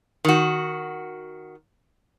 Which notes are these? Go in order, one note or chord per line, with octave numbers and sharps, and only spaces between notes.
D#3 F#4